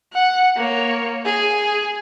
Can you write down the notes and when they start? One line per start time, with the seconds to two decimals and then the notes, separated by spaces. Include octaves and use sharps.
0.14 F#5
0.57 A#3 C#5
1.26 G#4